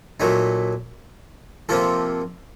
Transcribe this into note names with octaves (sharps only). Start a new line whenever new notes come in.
A#2 F#3 A3 D#4
C3 F3 A#3 F4 A4